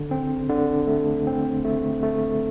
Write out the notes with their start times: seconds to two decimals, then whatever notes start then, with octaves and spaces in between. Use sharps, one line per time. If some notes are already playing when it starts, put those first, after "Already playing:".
Already playing: D3
0.11 C4
0.49 D3
0.87 A3
1.27 C4
1.65 A3
2.03 A3